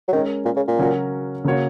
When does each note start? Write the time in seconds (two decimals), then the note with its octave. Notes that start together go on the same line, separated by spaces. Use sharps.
0.08 F#3
0.12 D#3 G#3 C#4 A#4 C#5
0.45 A#2
0.56 C#3
0.67 A#2
0.79 C#3 F#3 C#4 F#4 A#4
1.44 C#3 A#3 F#4 C#5